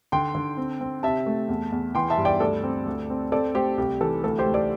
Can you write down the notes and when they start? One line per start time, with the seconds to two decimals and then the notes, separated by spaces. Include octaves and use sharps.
0.12 D3 G5 C6
0.35 D3
0.57 C4
0.81 C4
1.03 C3 E5 A5
1.26 A3
1.49 E2
1.72 E2
1.95 E3 G5 C6
2.10 E5 A5
2.17 G2
2.25 D5 G5
2.40 D2 A4 D5
2.64 C4
2.86 D2
3.10 C4
3.32 C4 A4 D5
3.54 A3 G4 C5
3.77 C2 G4
4.00 E3 A4
4.24 D2 A4
4.38 G4 C5
4.46 A3
4.54 A4 D5